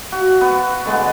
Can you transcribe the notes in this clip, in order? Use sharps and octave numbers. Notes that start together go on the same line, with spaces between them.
F#4
B3
D3 G#3 B3